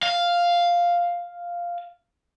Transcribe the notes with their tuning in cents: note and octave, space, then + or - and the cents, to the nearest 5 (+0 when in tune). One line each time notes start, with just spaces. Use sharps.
F5 +0